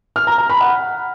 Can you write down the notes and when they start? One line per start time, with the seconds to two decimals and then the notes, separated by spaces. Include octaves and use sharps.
0.16 F6
0.27 A#5
0.38 A#5
0.49 B5
0.61 F#5